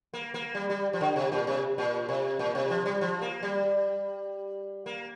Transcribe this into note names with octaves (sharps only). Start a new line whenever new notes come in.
A#3
A#3
G3
G3
F3
D3
C3
A#2
C3
A#2
C3
A#2
C3
F3
G3
F3
A#3
G3
A#3